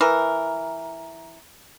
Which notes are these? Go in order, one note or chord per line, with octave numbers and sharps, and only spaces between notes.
E3 A#4